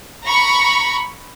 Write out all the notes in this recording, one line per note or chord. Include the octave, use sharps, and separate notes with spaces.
A#5 B5 C#6